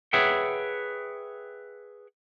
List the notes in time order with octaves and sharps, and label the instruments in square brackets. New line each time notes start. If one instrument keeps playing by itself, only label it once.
[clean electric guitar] G#4 B4 C#5 E5 F#5 G5